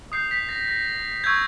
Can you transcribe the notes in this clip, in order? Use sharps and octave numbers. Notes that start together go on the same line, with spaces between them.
D#6 G6 C7
B6
A#6
A#6
C#6 E6 G6 G#6